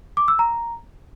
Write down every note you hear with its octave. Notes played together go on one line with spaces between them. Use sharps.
D6
E6
A#5